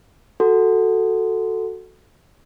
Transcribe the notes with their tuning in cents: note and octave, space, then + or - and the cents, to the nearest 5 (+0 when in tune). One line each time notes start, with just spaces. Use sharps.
F#4 +0 A4 +0